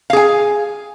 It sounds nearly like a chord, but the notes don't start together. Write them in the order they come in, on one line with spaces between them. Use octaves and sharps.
F5 G#4 G#5